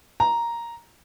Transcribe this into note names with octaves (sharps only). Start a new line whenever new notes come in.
A#5